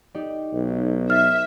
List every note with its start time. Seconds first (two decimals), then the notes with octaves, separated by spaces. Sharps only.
0.15 D#4 G4 D5
0.53 B1
1.10 E5 F6 A6 C7